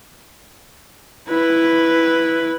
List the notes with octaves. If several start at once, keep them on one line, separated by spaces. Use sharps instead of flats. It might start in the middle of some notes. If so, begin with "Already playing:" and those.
E4 B4